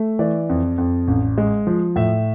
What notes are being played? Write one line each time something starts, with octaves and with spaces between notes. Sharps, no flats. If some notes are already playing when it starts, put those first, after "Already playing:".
Already playing: A3
E3 D5
F2
F2
A1
G#3
F3
A2 E5